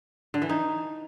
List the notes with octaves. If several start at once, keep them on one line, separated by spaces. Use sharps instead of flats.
D3
E3
D#4